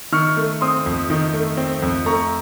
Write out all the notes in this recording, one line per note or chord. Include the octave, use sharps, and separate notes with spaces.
D#3 C#6 F6
A3
C4 C6 D#6
F2
D#3
A3
C4
F2
A3 A#5 C#6